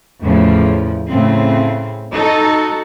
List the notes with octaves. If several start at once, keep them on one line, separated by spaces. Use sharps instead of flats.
E2 A2 C#3 F3
A2 C#3 C4
D#4 F#4 A4